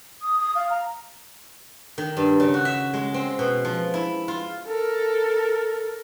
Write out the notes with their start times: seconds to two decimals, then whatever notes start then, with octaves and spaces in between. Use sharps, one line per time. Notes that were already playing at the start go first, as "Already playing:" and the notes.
0.22 D#6
0.40 D#6
0.55 F5
0.70 A#5
1.98 D#3
2.17 G2
2.40 C#3
2.54 F#4
2.65 E5
2.93 G#3
3.14 C4
3.39 B2
3.65 F3
3.94 E4
4.28 F4
4.67 A4 A#4